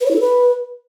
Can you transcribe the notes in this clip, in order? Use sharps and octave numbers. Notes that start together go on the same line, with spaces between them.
B4
C#5
E4
A4
B4